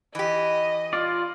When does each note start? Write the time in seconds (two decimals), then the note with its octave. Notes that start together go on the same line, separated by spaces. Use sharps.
0.15 E3 G4 D#5
0.93 F4 D5